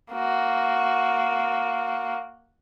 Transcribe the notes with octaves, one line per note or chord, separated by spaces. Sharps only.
A#3 F#4